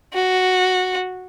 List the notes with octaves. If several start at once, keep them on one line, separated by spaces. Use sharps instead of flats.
F#4